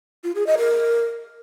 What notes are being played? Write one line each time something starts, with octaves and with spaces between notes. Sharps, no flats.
F4
G#4
D#5
A#4